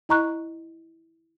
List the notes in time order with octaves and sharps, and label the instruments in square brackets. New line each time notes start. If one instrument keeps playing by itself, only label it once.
[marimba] E4 D#5 A#5 C#6 F#6